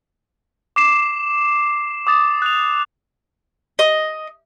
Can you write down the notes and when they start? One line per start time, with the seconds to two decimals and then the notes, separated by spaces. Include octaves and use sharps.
0.76 D6 C7 E7
2.07 D6 D#6 A6
2.42 F#6 F7
3.79 D#5